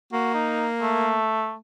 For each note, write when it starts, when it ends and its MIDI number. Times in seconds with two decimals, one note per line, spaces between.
0.13 1.19 58
0.13 0.30 66
0.34 0.66 63
0.81 1.55 57